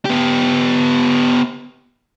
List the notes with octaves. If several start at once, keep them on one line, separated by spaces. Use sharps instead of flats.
B3 G4